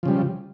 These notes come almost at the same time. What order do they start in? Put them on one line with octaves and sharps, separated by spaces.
F3 C#3 G3